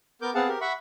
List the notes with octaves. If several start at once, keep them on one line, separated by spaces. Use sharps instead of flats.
B3 A#4 D6 G6
B3 C4 G#4 F5 F#5 A5
G4 A#4
E5 F#5 B5 C#6